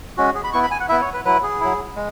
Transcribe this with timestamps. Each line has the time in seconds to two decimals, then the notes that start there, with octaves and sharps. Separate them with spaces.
0.17 G#3 C#4 F#4
0.35 G#4
0.44 B5
0.53 B3 E4 C#6
0.63 B5
0.71 G#5
0.80 F#5
0.89 B3 E4 E5
1.01 C#5
1.14 B4
1.25 F#3 E4 B4
1.43 G#4
1.60 F#3 E4
1.96 G#3